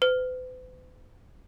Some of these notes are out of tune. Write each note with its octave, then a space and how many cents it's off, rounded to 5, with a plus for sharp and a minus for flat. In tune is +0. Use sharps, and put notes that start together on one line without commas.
B4 +45